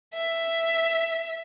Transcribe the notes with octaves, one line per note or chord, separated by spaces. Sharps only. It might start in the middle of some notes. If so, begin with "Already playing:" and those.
E5